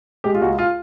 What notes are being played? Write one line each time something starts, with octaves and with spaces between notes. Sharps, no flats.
G#3 G4
F4
C#2 F#4
F4